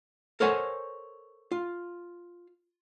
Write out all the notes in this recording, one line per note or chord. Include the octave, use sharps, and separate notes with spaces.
A4 A#4 C5 C#5 F#5 G#5
F4